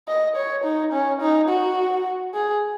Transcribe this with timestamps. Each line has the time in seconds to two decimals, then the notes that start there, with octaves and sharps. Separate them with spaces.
0.08 D#5
0.36 C#5
0.64 D#4
0.93 C#4
1.21 D#4
1.49 F#4
2.34 G#4